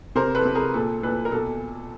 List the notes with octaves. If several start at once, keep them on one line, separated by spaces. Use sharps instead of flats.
C3 A#4 C5
A4 B4
C3
G#4 A#4
A#2 A4
A#2 A4 B4
A#4
B2 A4